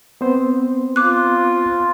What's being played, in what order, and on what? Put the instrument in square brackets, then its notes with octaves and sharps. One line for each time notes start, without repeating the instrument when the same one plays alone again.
[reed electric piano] B3 C4 C5
[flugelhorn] F4 [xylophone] D6 F#6